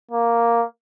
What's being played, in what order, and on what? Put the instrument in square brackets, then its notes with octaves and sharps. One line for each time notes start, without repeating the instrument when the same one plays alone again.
[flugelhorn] A#3